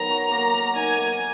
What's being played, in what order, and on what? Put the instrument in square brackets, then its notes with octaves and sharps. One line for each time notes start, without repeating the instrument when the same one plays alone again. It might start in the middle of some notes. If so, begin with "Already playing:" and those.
Already playing: [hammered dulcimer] D#3 F#3 B3 [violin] A#5
[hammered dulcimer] F#4
A#3
A#4
[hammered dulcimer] D#4 [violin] G#5
[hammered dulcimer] A#3